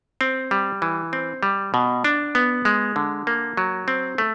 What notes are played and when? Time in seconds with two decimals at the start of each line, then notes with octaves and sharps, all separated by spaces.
0.21 C4
0.51 G3
0.82 E3
1.13 C4
1.43 G3
1.74 B2
2.04 D4
2.35 B3
2.65 G#3
2.96 D3
3.27 A#3
3.57 F#3
3.88 C4
4.18 A3